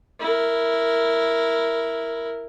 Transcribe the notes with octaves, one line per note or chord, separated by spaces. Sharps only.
E4 A#4